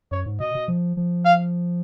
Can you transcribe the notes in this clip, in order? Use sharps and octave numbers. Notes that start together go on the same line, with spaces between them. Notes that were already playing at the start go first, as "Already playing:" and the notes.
F#2 C#5
G#2
B2 D#5
B2
F3
F3
F5